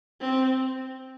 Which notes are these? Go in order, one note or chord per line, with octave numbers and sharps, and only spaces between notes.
C4